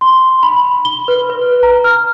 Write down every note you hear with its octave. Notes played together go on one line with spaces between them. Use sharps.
C6
B5
G7
B4
B4
A#5
F6